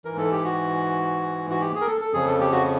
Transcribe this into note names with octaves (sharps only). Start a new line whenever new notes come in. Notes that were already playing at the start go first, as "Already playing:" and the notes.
G#2 E3 A#4
A4
G4
F#4
F#4
G4
G#4
A#4
A4
A4
F2 C#3 F3 G#4
A4
G4
F#4